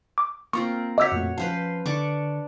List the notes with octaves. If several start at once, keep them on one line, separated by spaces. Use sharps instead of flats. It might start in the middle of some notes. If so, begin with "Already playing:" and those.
D6
A#3 C4 F4 A#4 C#6
F#4 C#5 D#5 D6 E6 G6 B6
F2 A#2 A3
F3 C#4 B4 C5 F5 A5
D3 D4 C#6 D6